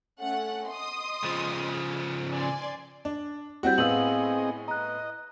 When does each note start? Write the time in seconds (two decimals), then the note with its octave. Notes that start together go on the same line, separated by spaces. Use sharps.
0.20 A3 C#4 F#5
0.68 D#5 C6 D#6
1.24 C#3 F3
2.31 D5 G#5 C6
3.05 D4
3.63 G3 C4 E4 F#4 F#5 G6
3.78 A2 B3 C4 G#4 D#5 F5 E6 F#7
4.68 D#5 A#5 F#6